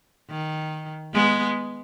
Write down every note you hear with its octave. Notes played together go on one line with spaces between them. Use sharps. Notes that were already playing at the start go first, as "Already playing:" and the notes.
D#3
G#3 B3